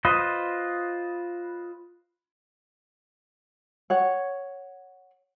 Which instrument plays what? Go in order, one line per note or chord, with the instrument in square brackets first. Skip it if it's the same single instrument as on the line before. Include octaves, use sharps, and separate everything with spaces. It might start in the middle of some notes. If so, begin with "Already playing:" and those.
[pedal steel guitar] F4 B4 C5 D#5
[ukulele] C#5 F#5